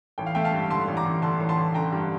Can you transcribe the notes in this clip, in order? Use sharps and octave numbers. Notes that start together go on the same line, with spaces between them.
A1 G5
F5
A3 E5 G5
F5 A5
G2
D3 A5 C6
A1
A#5 D6
A1
D3 A5 C6
A1
A5 C6
A1
D3 G5 A#5
G2